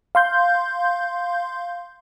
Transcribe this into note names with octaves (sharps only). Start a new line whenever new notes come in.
F5 C6 G6